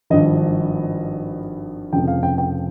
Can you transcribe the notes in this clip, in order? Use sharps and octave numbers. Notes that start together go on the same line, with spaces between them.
G#1 G2 F3 D#5
F1 F2 C#3 F3 G5
F5
G5
G5